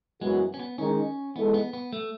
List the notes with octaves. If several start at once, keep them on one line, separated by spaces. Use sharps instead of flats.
F#2 E3 G#3 B3 F#4
C#4
B3
D#3 G#3 C#4 D#4
E3 G#3 B3 D#4 A4
B3
B3
A3